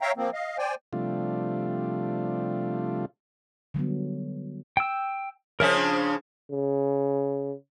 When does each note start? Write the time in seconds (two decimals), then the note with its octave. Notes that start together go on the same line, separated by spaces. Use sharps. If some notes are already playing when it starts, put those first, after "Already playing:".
0.01 C#5 E5 F5 G5 A#5
0.17 F3 A#3 C4
0.33 D#5 F5
0.58 C5 D5 G5 G#5
0.93 C3 F3 G3 A3 D4 F4
3.74 D3 F#3 G3 B3
4.77 G5 E6
5.60 C#3 F3 C#4 A#4 E5
5.77 D4 C5
6.51 C#3